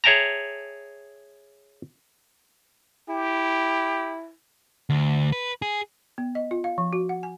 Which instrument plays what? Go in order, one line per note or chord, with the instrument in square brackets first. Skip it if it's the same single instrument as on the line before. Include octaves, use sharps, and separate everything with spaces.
[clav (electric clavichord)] G#4 C#5 E5 G5 A5 A#5
[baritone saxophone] E4 [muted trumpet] G4
[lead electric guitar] D2
B4
G#4
[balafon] B3
D#5
F4
F5
F3
F#4
F#5
G#5